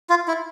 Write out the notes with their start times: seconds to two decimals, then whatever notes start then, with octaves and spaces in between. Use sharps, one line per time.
0.10 F4
0.28 E4